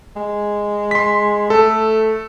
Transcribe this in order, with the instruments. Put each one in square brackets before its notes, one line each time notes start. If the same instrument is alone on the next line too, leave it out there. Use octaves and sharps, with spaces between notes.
[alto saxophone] G#3
[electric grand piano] C6 B6
[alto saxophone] A3 [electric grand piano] A4